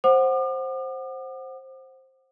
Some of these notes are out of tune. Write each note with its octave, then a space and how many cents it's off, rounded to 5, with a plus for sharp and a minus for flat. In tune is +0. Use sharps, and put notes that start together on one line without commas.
C5 +10 F#5 +0 D6 +45